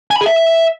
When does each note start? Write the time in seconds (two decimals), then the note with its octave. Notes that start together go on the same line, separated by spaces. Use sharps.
0.11 G#5
0.16 B5
0.21 G#4
0.26 E5